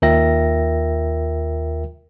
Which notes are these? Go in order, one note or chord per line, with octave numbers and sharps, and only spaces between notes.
D#2 F4 A#4 E5 G5 A#6